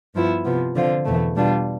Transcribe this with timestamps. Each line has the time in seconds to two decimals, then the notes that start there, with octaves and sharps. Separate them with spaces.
0.14 G2 F3 B3 E4
0.44 C3 F3 B3
0.75 D3 F3 C4 F4
1.05 E2 B2 A3
1.36 B2 G3 D4 F4